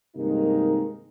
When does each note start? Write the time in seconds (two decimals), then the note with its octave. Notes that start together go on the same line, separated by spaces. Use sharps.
0.16 G2 C3 D#3 G#3 A#3 D#4